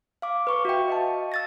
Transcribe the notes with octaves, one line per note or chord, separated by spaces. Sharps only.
F5 D6
B4 C#6
F#4 E5 G5
D#5 F5 A5
E6 A6 A#6